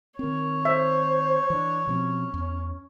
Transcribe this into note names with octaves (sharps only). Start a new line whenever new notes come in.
D#3 C4 A#4 C#5
C5 E5
E3 D4
B2 F3 C4 C#4
E2